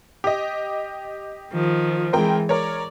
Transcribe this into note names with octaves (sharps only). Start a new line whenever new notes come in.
G4 D#5
D#3 F3
E3 G#3 C4 A#4 G5
A#4 C#5 D5